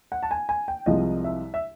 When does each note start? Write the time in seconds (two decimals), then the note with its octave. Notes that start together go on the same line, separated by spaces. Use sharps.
0.12 F#5
0.23 A5
0.31 G#5
0.49 G#5
0.68 G5
0.86 C2 C3 F3 G#3 D#5
1.24 E5
1.54 E5